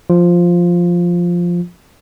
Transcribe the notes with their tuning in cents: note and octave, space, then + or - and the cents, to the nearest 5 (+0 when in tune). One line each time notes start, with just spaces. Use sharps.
F3 +0 F4 +0